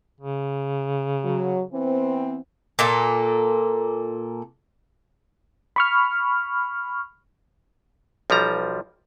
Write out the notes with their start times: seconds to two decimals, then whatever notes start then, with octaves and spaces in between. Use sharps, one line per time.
0.21 C#3
1.25 F#3
1.73 E3 B3 C4
2.79 A#2 A#3 A4
5.76 B5 C#6 F6
8.30 B1 F3 G3 A#5